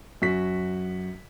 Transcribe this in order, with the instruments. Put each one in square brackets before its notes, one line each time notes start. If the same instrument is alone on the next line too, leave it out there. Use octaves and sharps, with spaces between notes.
[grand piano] F#2 F#4 B6